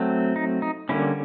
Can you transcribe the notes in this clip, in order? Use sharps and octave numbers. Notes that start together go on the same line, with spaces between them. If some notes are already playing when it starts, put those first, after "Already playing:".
Already playing: F#3 A3 C4
D#4
D#4
D3 G3 A#3 C#4 E4